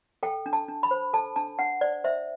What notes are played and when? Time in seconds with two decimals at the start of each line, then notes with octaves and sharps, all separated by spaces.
0.23 A4 G5
0.46 D4
0.53 A5
0.68 D4
0.83 B5
0.91 C5
1.13 A4 A5
1.36 D4 A5
1.59 D4 F#5
1.81 C5 D5
2.04 C5 E5